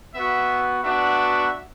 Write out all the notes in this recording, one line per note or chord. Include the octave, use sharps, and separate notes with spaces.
B3 F#4 E5
B3 D4 F#4 E5